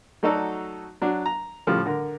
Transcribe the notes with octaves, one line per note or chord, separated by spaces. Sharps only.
F#3 A3 D#4 F#4 A4 D5
F#3 D4
A#5
A2 C#3 F3 G3 A3
D3 A#4